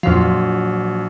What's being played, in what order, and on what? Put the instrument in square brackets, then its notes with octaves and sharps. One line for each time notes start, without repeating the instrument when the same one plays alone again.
[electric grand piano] A#1 F#3 [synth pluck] F2 F3